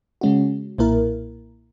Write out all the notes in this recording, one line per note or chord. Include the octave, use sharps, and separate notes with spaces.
C#3 G#3 C#4 F#4
B1 A#2 A#3 E4 A#4